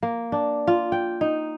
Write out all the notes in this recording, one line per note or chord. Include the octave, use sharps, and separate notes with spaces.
A#3
D4
F4
G5
D#4